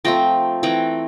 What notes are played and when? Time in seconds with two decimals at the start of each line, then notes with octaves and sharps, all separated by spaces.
0.05 F3 A3 C4 G5 A#5
0.63 E3 A3 C4 G5 A#5